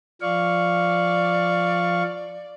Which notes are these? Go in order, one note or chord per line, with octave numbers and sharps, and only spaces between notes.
F3 D5 F5 C#6